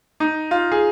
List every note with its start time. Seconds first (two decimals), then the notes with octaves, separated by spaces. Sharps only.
0.20 D#4
0.51 F4
0.72 G#4